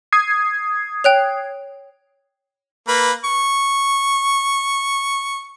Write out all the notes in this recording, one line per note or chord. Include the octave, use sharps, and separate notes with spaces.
D#6 G#6 C7
C#5 G5 F#6 F7
A#3 B4
C#6